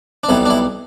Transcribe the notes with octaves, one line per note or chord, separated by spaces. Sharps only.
D4
B1 B2 G3 E4
D4
E4